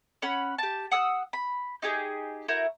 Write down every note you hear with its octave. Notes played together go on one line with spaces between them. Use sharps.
C#4 F#5 B5
G4 A5
F#5 D#6 E6 F#6
B5
D#4 G4 G#4
E4 F#4 A#4 G6